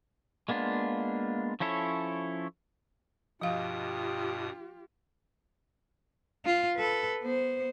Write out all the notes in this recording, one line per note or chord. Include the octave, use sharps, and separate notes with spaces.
G#3 A#3 B3 D4 F4
F3 C#4 E4 A4 C#5
G2 B2 F3 F4 G4 F5 D#6
F4
A4 B4
B3 C5